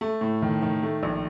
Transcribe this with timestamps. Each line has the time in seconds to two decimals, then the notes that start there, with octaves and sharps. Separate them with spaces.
0.01 A3
0.21 A2
0.42 D#3
0.62 D#3
0.83 A3
1.03 A#1